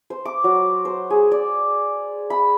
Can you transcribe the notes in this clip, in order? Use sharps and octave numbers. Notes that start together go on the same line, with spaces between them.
C5
D6
F#3
C5
G#4
D5
B5